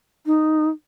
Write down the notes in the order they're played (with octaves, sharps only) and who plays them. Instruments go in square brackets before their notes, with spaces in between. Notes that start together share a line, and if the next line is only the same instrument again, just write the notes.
[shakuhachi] D#4